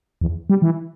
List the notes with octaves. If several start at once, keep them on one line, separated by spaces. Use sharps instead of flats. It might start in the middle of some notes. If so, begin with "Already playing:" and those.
E2
G3
E3